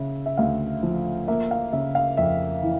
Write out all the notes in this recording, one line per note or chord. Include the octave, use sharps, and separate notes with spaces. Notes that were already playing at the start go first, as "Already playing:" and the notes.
Already playing: C#3 E5
E5
D2 F5
F3
A#3 E5
F5
C#3 E5
F5
F2 E5
E3